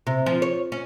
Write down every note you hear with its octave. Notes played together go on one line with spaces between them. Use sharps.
C3
F3
C#5
C#4